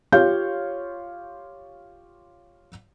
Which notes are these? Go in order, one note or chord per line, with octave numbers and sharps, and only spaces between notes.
F4 G4 C#5 F5 G6